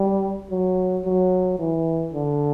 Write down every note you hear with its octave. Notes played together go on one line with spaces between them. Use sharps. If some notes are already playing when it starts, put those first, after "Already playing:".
Already playing: G3
F#3
F#3
E3
D3